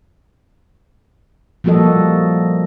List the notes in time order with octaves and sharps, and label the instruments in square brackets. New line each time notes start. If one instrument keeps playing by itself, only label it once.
[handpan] F3 G3 A#3 F#4 A4 D#5